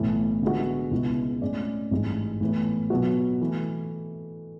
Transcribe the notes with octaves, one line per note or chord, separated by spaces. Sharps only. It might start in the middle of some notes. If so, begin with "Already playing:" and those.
Already playing: B1 A2 E3
D3 G#3 B3 F#4
C#2 B2 G#3 B3 E4
A2 G#3 C#4 G#4 D5
A1 G#2 G#3
A2 E3 B3
B2 F#3 B3 F#4
E3 A3